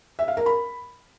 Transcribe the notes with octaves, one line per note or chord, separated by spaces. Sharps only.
E5
F5
A#4
B5